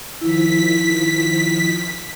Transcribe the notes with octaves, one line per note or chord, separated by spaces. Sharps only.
D#3 F3 E4 B6